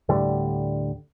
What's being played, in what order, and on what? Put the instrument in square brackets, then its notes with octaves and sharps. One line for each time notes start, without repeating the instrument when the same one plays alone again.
[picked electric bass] D2 A2 D3 G3